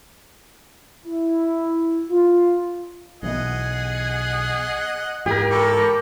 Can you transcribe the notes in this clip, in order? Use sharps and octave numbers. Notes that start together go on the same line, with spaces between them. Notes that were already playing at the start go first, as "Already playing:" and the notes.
E4
F4
B1 E3 B3 G#4 D#5 F#5
G#2 E3 G4 G#4 A#4
A4 B5 C#6 D6